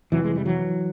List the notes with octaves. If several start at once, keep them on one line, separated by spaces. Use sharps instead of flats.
F2 C3 E3 F#3
G#3
G3
E3 F#3